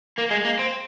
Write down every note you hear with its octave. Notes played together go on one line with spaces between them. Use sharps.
A#3
G#3
A#3
C4